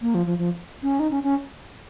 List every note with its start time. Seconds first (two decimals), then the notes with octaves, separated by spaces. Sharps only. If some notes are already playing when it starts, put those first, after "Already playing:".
0.02 A#3
0.15 F3
0.27 F3
0.38 F3
0.83 C#4
1.00 D#4
1.11 C#4
1.23 C#4